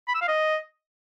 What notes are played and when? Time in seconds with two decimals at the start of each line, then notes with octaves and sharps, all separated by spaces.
0.08 B5
0.15 E6
0.22 F5
0.28 D#5